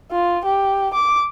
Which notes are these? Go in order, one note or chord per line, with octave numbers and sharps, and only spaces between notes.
F4
G4
D6